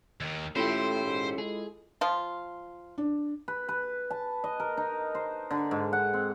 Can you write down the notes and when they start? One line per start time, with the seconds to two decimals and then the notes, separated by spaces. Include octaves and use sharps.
0.21 D#2 D#3
0.56 A3 C#4 E4 F4 G4 A4 C5
1.05 G#2
1.38 G#3 G#4
2.01 F3 F4
2.98 D4
3.48 B4
3.69 B4
4.10 A5
4.44 D#5
4.60 A#4
4.77 D#4
5.15 C5
5.51 D3
5.71 G#2
5.93 F#5
6.13 C4